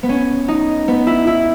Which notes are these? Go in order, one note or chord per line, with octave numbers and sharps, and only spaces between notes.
B3
C#4
D#4
B3
E4
E4